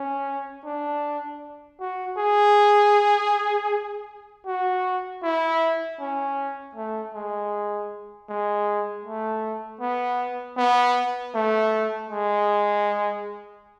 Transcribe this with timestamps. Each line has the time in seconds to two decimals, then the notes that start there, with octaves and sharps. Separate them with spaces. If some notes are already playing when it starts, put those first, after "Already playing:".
Already playing: C#4
0.65 D4
1.80 F#4
2.17 G#4
4.46 F#4
5.23 E4
6.00 C#4
6.75 A3
7.14 G#3
8.29 G#3
9.05 A3
9.81 B3
10.57 B3
11.34 A3
12.10 G#3